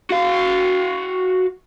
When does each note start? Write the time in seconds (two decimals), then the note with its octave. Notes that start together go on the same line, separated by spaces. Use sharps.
0.11 F#4 F5